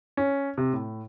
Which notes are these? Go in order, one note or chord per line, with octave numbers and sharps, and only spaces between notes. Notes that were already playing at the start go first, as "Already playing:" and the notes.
C#4
C3
A2